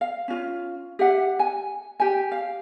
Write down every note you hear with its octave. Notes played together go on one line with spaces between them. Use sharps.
F5
C#4 F4
G4 E5 F#5
G#5
G4 G#5
F5